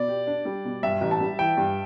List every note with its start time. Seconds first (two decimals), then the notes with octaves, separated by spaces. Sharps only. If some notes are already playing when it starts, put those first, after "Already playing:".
Already playing: B2 D5
0.08 G4
0.27 D4
0.45 G3
0.65 B2
0.83 G2 E5
1.01 A1
1.11 A5
1.21 G3
1.39 E3 G5
1.57 G2